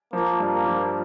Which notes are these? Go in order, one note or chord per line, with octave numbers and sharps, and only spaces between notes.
F3 A#3
G2
A#3
F3